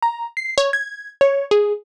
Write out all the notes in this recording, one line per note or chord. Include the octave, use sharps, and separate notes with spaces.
A#5
C7
C#5
G#6
C#5
G#4